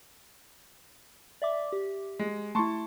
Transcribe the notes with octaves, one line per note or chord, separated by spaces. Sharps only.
D5 E5 D6
G4
G#3
A3 E4 A5 C6 C#6